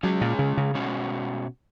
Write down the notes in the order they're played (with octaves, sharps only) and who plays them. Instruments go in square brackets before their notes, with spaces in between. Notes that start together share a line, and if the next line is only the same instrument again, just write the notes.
[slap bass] F#3 [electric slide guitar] G#3 C#4 G#4
[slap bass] A#2
C#3
C#3
[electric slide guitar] B2 G#3 C#4 F#4